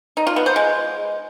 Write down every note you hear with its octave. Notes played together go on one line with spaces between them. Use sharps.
D#4
F4
B3
C5
G#3